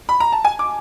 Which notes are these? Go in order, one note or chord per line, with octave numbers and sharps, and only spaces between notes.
B5
A#5
A5
G#5
D6